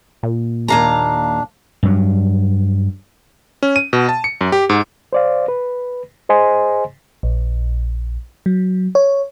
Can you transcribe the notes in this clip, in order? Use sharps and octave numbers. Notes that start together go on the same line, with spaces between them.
A#2
D#2 D4 F5 A#5
G2 F#3
C#4
D#7
B2
A5
C#7
F#2
G4
G#2
C5 D5 F5
B4
G#4 C5 D#5 G#5 C6
A#1
F#3
C#5